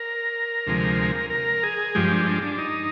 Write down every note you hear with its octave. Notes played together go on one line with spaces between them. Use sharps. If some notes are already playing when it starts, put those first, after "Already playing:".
Already playing: A#4
D2 C3 F3 G#3
A#4
G#4
G2 F3 G#3 G4
D4
D4
D4
D#4